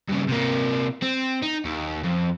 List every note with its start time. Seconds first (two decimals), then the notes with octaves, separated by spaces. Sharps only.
0.09 G2 C#3
0.28 C3 A#3
1.02 C4
1.43 D#4
1.65 D#2
2.03 F2